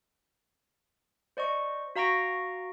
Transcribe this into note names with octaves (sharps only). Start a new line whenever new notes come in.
C5 D5 D#5 C#6
F#4 F5 A#5 C#6 A#6 D7